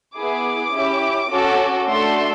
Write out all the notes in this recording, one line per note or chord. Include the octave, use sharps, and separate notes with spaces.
B3 E4 G#4 D6
C#4 E4 G4
C#4 F#4 A4
A3 D4 F#4 A4 C6